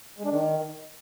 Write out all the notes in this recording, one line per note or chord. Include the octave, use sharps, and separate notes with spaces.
G#3
D4
D#3